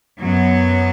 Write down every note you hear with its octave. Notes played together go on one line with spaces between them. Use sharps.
F#2 F#3 B3